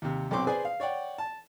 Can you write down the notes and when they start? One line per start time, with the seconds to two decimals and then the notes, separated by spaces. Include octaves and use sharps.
0.02 D#2 C3
0.31 B1 F#3 C4 C6 D6
0.47 G#4 B4 C5 D5 G#5
0.65 F5
0.80 C#5 D5 F#5 G5
1.18 A5